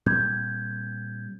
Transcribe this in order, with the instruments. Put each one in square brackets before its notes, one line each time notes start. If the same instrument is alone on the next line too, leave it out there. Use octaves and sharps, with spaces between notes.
[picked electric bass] A#2 G3 C4 [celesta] G6 G#6